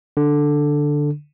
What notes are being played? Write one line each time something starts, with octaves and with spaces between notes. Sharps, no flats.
D3